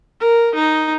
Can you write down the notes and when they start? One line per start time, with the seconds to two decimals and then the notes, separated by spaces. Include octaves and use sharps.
0.20 A#4
0.55 D#4